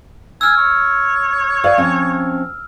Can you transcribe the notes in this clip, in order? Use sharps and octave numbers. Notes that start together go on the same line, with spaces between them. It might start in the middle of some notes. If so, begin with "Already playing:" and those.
G#5 E6 F6
C#5
B4 D5 F5
F3 C4 C#4